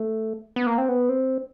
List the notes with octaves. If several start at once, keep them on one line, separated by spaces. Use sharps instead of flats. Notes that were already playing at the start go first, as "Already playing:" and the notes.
Already playing: A3
B3
A#3
C4
B3
C4